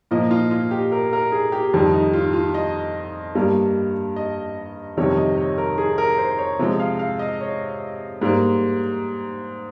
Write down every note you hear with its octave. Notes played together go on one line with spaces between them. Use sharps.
A#2 F3 A#3 D#5
F4
F4
G4
A#4
A#4
G#4
G4
F2 D#3 G3
D#4
F4
F4
D#5
G2 G3 A#3
D#5
F2 C3 D#3 G3 C#5
D#5
C#5
A#4
G#4
A#4
C5
C#5
C3 F3 G#3
F5
F5
D#5
C#5
G#2 G3 A#3